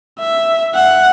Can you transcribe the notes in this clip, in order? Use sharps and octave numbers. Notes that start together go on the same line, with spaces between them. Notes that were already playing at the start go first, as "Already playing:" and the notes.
E5
F#5